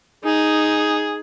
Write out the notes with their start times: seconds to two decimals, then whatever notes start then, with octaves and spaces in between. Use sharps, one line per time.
0.25 D#4 G#4